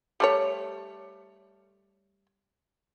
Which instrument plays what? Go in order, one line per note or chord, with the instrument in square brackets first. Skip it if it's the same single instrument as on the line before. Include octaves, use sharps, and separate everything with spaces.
[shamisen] G3 A3 C#5